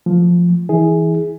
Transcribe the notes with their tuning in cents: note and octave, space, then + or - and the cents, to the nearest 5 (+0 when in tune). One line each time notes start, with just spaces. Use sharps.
F3 +0 A3 +0
E3 -15 E4 -30 G#4 +0